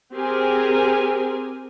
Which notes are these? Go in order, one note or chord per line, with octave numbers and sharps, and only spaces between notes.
C4 G4 G#4 A#4 G#5